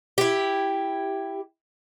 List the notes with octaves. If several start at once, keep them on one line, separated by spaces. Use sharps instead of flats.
E4 G4